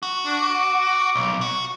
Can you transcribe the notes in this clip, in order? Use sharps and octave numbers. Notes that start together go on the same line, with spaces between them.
F#4
D4
D6
B1
F#4